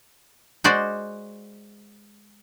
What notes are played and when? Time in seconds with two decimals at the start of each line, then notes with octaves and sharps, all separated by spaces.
0.64 G#3 F#4 C5 D5